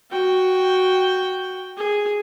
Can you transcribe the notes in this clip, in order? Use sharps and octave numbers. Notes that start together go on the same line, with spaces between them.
F#4 G5
G#4